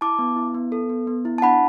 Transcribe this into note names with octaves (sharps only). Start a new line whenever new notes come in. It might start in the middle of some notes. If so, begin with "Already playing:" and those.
E4 A5 D6
B3
E4
B3
A4
B3
B3
E4
A5
D4 F#5 B5